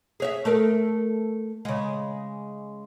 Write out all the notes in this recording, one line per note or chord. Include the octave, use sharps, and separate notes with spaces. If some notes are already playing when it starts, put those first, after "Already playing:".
G#4 C#5 E5
A3 A4 A#4
C#3 G#3